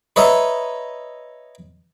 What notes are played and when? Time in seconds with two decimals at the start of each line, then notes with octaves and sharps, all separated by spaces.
0.16 B4 C#5 D#5 E5 A#5